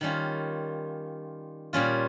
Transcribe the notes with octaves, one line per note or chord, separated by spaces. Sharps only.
D#3 G3 C#4 F4
A#2 G3 C#4 F4